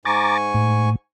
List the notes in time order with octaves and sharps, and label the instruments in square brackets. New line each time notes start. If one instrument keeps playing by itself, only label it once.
[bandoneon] G#2 G#5 C#6 [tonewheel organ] A#5 D6 A6
[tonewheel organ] A2